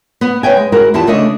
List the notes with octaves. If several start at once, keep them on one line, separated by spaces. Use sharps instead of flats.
B3
B4 C#5 E5 G5 G#5
G#3
G#3 E4 F#4 A#4
E2 E4 F4 G4 A5
D2 C#3 A3 D4 D#5 E5